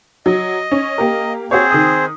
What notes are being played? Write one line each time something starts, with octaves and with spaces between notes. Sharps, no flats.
F#3 D#5
C#4
A#3 G4 A#4
C4 F#4 G#4 C5 C#5
D#3 D#6